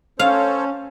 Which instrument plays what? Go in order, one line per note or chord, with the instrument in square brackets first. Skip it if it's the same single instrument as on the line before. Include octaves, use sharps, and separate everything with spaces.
[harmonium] C#4 [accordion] A4 C5 C#5 [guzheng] F5